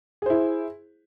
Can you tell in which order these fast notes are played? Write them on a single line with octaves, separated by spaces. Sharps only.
G#4 C5 E4